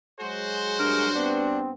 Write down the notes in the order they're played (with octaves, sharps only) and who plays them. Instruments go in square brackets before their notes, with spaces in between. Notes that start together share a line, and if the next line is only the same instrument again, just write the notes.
[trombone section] F#3 G#3 G#4 [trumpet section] F#4 C5
[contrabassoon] G2 [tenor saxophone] A#4
[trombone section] B3 C4 [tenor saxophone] D4